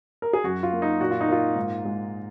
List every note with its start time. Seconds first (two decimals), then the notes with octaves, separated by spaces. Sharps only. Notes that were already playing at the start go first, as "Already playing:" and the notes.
0.22 A#4
0.33 G#4
0.44 F#2 F#4
0.63 F4
0.72 A#3
0.82 D#4
1.01 A#2 F#4
1.11 F4
1.21 D#4
1.28 A#3 F4
1.56 G#2
1.85 G#3